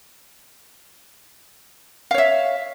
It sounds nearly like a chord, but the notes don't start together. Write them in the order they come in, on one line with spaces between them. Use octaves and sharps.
F5 C#5 E5